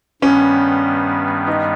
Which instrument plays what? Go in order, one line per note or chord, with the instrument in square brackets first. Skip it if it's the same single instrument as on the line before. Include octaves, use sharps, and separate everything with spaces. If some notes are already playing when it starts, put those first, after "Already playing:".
[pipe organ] G2 D#3 G3 B3 [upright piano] C#4
[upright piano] D#4